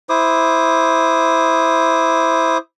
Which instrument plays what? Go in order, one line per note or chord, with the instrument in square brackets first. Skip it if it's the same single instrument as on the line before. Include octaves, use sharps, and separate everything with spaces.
[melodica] E4 C5 D6 D#6